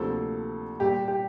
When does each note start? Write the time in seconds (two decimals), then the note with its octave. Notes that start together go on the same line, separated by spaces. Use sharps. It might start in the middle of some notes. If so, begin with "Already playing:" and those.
Already playing: D2 C3 F3 A#3 A4
0.80 A#2 G3 A#3 G4
1.08 G4